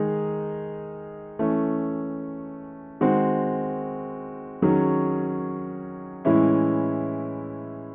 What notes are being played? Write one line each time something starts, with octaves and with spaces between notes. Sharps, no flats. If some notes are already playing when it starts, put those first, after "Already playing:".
Already playing: D#3 G#3 D#4 G#4
E3 A3 C#4
D#3 G#3 C4 F#4
D#3 F#3 C#4 G#4
A2 E3 G#3 C#4 E4